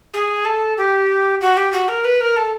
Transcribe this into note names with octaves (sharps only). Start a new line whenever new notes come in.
G#4
A4
G4
F#4
G4
F#4
A#4
B4
A#4
A4